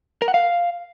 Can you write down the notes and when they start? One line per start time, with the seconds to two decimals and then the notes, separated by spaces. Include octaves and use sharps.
0.22 A#4
0.28 F#5
0.34 F5